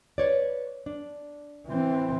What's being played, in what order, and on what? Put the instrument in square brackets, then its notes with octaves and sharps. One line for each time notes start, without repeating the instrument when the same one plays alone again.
[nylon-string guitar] B4 C#5 D5
D4
[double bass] E3 C4